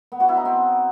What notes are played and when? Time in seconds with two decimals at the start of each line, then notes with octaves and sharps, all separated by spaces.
0.12 B3
0.20 F#4
0.29 E4
0.37 D#4
0.45 C4